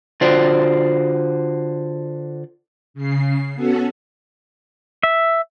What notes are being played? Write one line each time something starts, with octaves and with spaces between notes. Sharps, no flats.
D3 F4 F#4 C5 D5 G5
C#3 C7
B3 C#4 F#4 A4
E5